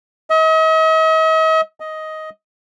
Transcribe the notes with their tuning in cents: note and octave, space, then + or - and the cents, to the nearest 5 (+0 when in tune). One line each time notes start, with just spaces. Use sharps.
D#5 +45
D#5 +10